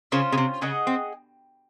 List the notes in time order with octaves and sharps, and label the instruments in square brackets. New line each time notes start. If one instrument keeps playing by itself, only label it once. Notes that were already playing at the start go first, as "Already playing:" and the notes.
[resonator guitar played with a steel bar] C#3 [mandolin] C#4 F4 C5
[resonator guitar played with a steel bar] C#3
C3
[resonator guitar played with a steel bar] C#3 [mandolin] G#4 D#5 F#5
[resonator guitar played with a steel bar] C4